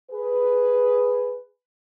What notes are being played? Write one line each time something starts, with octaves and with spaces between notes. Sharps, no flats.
G#4 B4